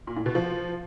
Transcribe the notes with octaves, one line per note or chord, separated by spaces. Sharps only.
A#2
A2
B2
F3